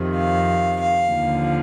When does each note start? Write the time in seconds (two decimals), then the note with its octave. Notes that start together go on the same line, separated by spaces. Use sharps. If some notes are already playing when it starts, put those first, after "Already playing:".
Already playing: F2 C3 D#3
0.16 F5
0.81 F5
1.13 D#2 D3 F3